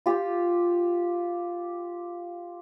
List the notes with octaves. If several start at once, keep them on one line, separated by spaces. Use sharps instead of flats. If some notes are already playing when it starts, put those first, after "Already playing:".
F4 G4